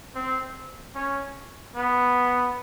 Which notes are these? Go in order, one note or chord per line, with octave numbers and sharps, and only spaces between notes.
C4
C#4
B3